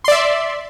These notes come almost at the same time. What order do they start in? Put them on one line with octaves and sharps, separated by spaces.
C6 D5 E5